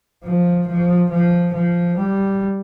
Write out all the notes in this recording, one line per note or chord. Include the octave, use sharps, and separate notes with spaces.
F3
F3
F3
F3
G3